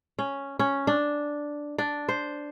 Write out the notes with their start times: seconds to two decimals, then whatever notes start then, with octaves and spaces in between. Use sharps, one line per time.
0.19 C#4
0.59 C#4
0.87 D4
1.78 D4
2.09 C5